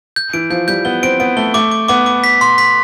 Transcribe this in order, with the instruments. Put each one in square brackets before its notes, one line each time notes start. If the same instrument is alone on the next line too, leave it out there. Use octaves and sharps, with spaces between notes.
[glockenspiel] G6
[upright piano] E3 [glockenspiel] D7
[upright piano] F3 [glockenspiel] G6
[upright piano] G3 [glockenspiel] G6
[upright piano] B3 [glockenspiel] G7
[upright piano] C4 [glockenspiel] D7
[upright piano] B3 [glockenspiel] D7
[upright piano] A3 [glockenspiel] G7
[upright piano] A3 [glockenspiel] D6
[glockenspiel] D6
[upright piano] B3 [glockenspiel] D6
[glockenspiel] D6
B6
C6
B6